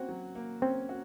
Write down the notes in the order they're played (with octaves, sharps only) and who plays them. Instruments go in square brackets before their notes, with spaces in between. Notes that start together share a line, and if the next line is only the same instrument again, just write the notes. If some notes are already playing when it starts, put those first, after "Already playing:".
Already playing: [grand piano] A#3 C#4 F#4 [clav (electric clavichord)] C4
[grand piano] F#3
A#3
[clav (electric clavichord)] C4 [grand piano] C#4
[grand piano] F#4